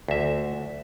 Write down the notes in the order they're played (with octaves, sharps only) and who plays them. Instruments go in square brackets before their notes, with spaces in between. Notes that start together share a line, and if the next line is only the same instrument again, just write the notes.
[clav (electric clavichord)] D2 E5